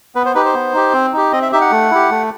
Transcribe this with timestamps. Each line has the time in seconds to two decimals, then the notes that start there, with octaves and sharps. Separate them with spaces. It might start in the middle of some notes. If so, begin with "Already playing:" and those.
0.15 B3 B4
0.26 C5
0.35 D#4 G4 B4
0.45 C5
0.54 B3
0.74 D#4 G4
0.93 C4
1.13 D#4 G4
1.32 C4 D#5
1.42 E5
1.52 D#4 G4 E5
1.61 F#5
1.72 A3
1.91 E4 G4
2.10 A3